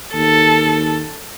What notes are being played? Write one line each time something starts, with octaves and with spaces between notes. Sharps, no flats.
D#2 A4